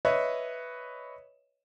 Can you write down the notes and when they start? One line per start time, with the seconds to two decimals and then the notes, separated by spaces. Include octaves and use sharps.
0.05 B4 C#5 D#5 E5